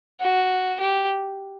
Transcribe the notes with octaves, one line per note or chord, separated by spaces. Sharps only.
F#4
G4